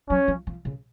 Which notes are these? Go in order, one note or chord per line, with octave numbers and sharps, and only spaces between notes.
F#3 C#4
F3
F3
C#3